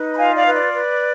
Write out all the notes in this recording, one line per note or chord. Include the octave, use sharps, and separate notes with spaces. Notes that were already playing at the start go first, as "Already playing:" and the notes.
Already playing: D#4 B4
B5
F4 F5 G#5
D5 F5
B4
D5
B4